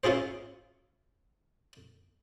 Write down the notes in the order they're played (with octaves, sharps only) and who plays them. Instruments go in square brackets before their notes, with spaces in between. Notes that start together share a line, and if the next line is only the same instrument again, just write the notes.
[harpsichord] C#4 E4 F4 G#4 C5